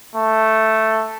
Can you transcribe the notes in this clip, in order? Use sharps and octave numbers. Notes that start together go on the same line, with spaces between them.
A3